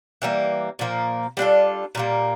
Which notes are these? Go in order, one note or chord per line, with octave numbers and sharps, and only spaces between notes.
E3 G3 A#3
A#2 F3 A#3
G3 D4 F4 A4
A#2 G3 A#3